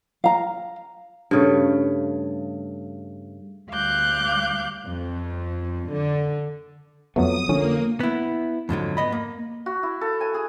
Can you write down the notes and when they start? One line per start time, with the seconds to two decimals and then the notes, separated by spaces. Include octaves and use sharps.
0.24 F5 A#5
1.31 G2 C#3 A3
3.72 D2 G3 F5 D6 F#6 G6
4.86 F2
5.91 D3
7.16 F2 F#3 A3 B3 D#6
7.49 D3 F3 A#3 C#4
8.00 B3 E4
8.69 F2 G#2 D3 F#3
8.97 B3 D#5 B5
9.12 A#3
9.66 F#4
9.83 E4
10.01 A4
10.21 G#5
10.34 G#4